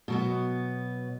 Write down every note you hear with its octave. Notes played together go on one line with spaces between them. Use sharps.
B2 F#3 B3